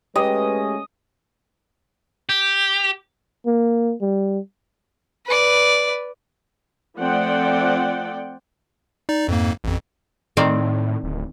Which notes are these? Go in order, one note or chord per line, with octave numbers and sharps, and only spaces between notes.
G#3 A3 C#4 G4 B4 D#5
G4
A#3
G3
B4 D5
F3 A3 C4 D5 F#5 G5
D#4 D5
F2 G#2 A#3
A1 F2
A2 D#3 C4 D5
D1